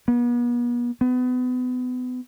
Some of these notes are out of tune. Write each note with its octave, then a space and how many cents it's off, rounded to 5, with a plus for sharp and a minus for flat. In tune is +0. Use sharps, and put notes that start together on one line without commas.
B3 -40
B3 +30